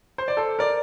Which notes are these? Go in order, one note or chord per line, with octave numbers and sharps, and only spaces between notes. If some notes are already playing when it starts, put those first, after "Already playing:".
C5
D5
A4 C5
A#4 D5